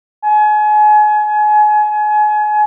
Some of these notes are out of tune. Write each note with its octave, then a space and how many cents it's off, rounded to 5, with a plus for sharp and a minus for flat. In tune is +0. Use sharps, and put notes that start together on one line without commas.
G#5 +30